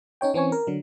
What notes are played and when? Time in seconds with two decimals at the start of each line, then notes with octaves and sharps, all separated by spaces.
0.21 C#4 D#4 C#5 G5
0.34 E3 C4 C#4 G#5 C#6
0.52 A#4
0.67 D3 F#3